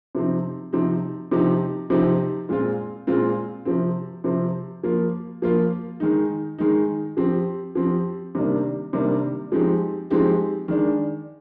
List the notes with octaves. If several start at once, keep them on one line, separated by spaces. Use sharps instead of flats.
C3 F3 C4 D#4
C3 F3 C4 D#4
C3 F3 C4 D#4 G4
C3 F3 C4 D#4 G4
A#2 G#3 C4 F4
A#2 G#3 C4 F4
C3 F3 C4
C3 F3 C4
F3 A#3 F4
F3 A#3 F4
D#3 G#3 D#4
D#3 G#3 D#4
F3 C4 G4
F3 C4 G4
C3 D#3 G3 A#3 D4
C3 D#3 G3 A#3 D4
F3 G#3 C4 D#4 G4
F3 G#3 C4 D#4 G4
D#3 G#3 D4